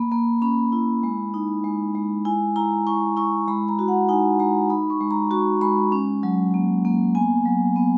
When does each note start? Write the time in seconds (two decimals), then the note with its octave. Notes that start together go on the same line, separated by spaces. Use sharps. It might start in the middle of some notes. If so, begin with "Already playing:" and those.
Already playing: A#3 B5
0.11 A#3
0.42 C#4 B5
0.72 E4
1.03 G#3
1.34 D#4
1.64 G#3
1.95 G#3
2.25 E4 G#5
2.56 E4 A#5
2.87 E4 C#6
3.17 E4 C#6
3.48 G#3 B5
3.69 A#5
3.79 F#4
3.88 F#5
4.09 D#4 G#5
4.39 G#3 A#5
4.70 D#4 B5
4.90 C#6
5.01 G#3
5.11 A#5
5.31 F#4 C#6
5.61 G#3 B5
5.92 C#4
6.23 F#3
6.54 A#3
6.85 A#3
7.15 B3 G#5
7.45 F#3
7.76 B3